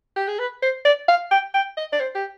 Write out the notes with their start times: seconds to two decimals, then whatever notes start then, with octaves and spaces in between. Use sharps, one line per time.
0.16 G4
0.28 G#4
0.39 B4
0.62 C5
0.85 D5
1.09 F5
1.31 G5
1.54 G5
1.77 D#5
1.93 D5
2.00 C5
2.15 G4